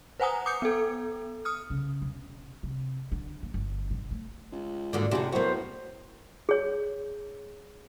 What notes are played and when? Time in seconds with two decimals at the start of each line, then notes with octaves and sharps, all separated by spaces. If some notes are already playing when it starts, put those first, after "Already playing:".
0.20 B4 C5 F#5 G#5 A#5 D#6
0.46 D6 D#6 G6 C#7
0.62 B3 A4
1.45 D#6 F6
1.70 C#3
2.02 E1
2.63 C3
3.12 D3
3.43 A#3
3.54 G1
3.91 B2
4.11 A3
4.52 C#2
4.93 D#2 G#2 D3 A#3 D4 F#4
5.11 A1 F2 C3 F#4 G#4
5.32 A2 F#3 A#3 B3 F#4 C5
6.49 G#4 C#5